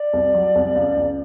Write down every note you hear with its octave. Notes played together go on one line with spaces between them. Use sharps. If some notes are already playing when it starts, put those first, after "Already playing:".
Already playing: D5
C2
F#3
C2
C#2
C#2